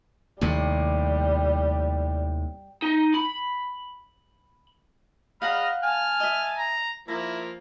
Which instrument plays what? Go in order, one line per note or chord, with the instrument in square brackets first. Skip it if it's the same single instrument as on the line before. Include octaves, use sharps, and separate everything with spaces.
[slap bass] D#2 A2 C3 [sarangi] G3
[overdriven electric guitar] D#4
B5
[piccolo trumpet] D#5 [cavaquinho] F5 F#5 A#5 [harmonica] B5 F6
[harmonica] G#5 A5 [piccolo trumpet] F6
[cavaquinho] D#5 E5
[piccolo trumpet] A#5
[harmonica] F3 A#3 [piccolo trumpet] E4 [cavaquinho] A#5